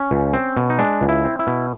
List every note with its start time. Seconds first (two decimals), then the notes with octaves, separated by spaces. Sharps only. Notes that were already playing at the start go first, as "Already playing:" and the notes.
Already playing: C#4
0.11 C#2
0.33 C4
0.57 B2
0.70 D#4
0.79 G#3 D4
1.01 C#2
1.08 E4
1.24 C4
1.39 E4
1.47 B2